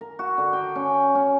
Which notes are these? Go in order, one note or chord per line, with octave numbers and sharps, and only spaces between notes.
A#4
F#4
D3
G5
C#4
C#4